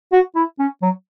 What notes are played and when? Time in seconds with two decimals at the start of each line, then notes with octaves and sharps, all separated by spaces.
0.12 F#4
0.35 E4
0.59 C#4
0.82 F#3